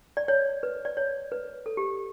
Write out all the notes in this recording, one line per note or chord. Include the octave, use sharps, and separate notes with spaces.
D5
C#5
B4
D5
C#5
B4
A4
G4